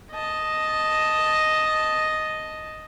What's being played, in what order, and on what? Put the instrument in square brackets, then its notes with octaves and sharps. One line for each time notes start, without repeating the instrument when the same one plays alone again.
[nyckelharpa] D#5 A5